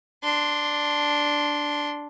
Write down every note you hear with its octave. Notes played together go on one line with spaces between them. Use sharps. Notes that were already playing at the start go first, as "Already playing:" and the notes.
D4 C6